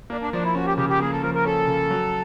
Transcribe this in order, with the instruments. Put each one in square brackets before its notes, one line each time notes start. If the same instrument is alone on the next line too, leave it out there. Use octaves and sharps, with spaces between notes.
[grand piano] A#3 [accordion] D4
[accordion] D4
[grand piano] F3 [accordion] D4
[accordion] E4
[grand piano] C#4 [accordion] F#4
[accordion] G4
[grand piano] C#3 [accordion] G4
[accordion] G4
[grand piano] A#3 [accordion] G#4
[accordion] A4
[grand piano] F3 [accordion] A#4
[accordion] A#4
[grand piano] C#4 [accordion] A4
[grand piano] C#3
F#3